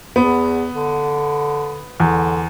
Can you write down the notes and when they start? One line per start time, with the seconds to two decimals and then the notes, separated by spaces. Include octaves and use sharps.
0.16 E2 B3
0.73 D3
2.00 E2 D3